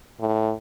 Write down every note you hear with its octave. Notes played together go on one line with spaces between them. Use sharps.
A2